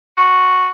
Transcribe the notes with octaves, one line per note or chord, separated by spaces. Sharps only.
F#4